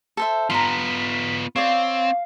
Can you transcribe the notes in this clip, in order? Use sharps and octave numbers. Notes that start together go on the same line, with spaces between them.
A4 C5 E5
B3 F4 A#5 C6 B6
C4 C#5 D5 F5